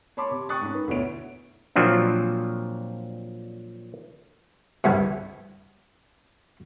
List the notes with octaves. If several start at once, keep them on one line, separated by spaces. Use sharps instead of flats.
C#5 A5 B5 C6 D6
C3
G5 C#6 D#6 F#6 A6
G#2 C#4
B4
D2 B2 B3 E4 C#5 D7
A#2 F3 F#3 C4 D4
C2 G2 C3